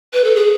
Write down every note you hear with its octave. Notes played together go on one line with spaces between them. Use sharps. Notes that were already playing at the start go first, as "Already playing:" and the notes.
B4
A4
G#4